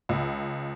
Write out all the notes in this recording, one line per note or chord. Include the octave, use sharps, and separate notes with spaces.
C#2